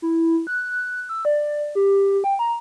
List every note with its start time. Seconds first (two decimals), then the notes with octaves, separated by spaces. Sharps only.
0.02 E4
0.47 F#6
1.09 E6
1.25 D5
1.75 G4
2.24 G5
2.39 A#5